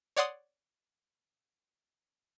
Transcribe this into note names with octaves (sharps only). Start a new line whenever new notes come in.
C#5 D5 F#5 C6 D#6